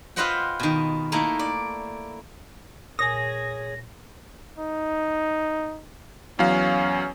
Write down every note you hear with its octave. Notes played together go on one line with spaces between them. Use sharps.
F4 B4 C5 D#5 F#5 G5
B2 D#3
A3 A#3 D#4 E4
D5
A#2 G#4 C#5 G#5 D#6 A#6
D#4
E2 F#3 C#4 F5